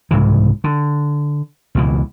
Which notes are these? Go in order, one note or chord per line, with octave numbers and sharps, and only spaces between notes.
C2 G#2 C#3 E3
D3
C#2 B2 E3